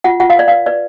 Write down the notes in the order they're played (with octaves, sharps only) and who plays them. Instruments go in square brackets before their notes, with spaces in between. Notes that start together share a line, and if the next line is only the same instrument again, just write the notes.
[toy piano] F4 F#5
F4 F#5
F5
B4 D5
B4 F5
B4 D5